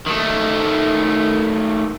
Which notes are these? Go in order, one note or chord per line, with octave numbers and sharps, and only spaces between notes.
D#3 A3